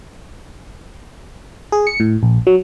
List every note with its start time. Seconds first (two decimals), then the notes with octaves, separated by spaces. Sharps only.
1.72 G#4
1.87 C#7
2.00 A2
2.23 A#1
2.47 F#3